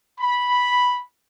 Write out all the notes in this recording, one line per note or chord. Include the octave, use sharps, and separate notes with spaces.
B5